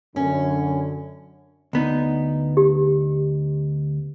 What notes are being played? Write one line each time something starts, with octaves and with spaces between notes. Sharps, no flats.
F#2 D3 C#4
D2 B3 D#4
G4